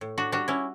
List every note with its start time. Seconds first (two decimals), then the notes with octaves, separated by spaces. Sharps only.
0.01 A2
0.18 D4 F#4
0.32 G3 D4 F#4
0.48 C#4 E4